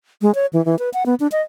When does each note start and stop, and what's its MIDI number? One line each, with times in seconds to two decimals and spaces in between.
0.22 0.34 56
0.35 0.46 73
0.53 0.64 52
0.65 0.78 52
0.79 0.90 71
0.94 1.06 78
1.06 1.15 59
1.20 1.27 62
1.32 1.41 75